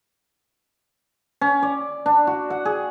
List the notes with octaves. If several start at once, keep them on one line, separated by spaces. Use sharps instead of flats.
C#4
D5
D4
F#4
F#5
G#4